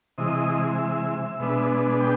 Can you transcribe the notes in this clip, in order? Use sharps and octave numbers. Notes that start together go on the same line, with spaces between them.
C3 E3 G#3 D#5
E5
B2 G#3 B3 D4
G5